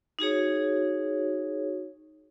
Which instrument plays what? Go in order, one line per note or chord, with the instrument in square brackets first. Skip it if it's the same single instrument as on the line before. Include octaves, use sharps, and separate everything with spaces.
[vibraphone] D#4 F#4 G#4 C#5